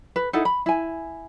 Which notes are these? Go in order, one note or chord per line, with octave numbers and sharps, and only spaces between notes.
B4
D#4 E4 A4 F#5
B5
E4 G#5